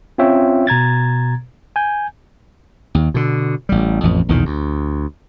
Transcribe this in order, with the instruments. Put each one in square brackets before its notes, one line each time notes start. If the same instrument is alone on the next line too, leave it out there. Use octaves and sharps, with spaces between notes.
[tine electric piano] C4 C#4 F4 C#5 E5 G5
B2 A#5 G#6 A6
G#5 G6
[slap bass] D#2
B2 D3
A1 G3
A1 F2
B1 E2 A#2 D#3
D2